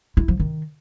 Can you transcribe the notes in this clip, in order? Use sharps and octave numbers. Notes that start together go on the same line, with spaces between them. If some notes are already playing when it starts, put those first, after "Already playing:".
E4
F3
D#3